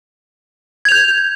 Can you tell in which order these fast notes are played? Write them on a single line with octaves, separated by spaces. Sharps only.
G#6 F7 G6